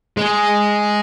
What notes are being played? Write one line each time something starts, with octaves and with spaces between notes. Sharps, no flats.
G#3